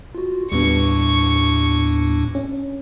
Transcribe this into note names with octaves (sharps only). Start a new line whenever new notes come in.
F4 F#4
D#2 A2 G3 B3 D4 C#6
C#4